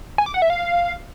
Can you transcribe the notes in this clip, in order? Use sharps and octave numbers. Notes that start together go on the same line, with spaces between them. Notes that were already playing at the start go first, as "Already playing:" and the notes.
G#5
D6
F#5
E5
F5